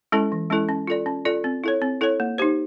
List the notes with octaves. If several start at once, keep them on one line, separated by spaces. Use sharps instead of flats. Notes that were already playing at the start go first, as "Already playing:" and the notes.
G#3 C#4 E4 A4
E3
G#3 C#4 E4 A4
C#4
F4 A4 D5
C#4
F4 A4 D5
C4
E4 A4 C#5
C4
E4 A4 C#5
A#3
D#4 G4 C5